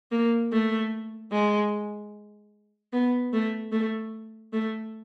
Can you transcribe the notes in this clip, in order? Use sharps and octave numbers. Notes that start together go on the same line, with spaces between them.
A#3
A3
G#3
B3
A3
A3
A3